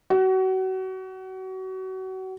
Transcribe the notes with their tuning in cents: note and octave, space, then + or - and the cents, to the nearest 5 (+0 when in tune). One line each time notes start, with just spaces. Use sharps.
F#4 +30